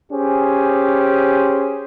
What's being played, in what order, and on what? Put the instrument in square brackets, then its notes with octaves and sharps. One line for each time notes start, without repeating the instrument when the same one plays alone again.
[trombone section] C#4 G4 G#4 C5